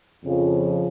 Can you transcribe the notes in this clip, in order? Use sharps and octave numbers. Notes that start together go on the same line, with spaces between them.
F2 C#3 F3